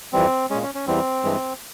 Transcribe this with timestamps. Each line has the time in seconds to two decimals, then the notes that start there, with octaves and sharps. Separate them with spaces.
0.13 F2 E3 G3 C4
0.50 G#3 C#4
0.54 A#2
0.63 C#4
0.75 C#4
0.87 E2 E3 G3 C4
1.23 G2 E3 G#3